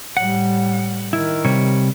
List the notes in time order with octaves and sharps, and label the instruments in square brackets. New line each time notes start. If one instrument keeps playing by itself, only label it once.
[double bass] A2 G3 [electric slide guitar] F#5
[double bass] D#3 [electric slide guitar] E4
[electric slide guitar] C3 G3 C#5